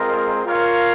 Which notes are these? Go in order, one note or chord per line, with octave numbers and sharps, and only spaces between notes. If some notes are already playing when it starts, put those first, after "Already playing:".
Already playing: G#3 C4 F4 A#4 D#5
F4 A#4 C#5 F5